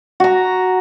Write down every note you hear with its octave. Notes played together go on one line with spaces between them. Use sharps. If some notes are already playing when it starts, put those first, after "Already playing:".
F#4 A#5